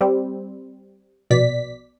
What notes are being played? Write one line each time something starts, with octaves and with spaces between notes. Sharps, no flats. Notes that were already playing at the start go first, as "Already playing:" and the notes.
G3 C4
A#1 B2 D5 B6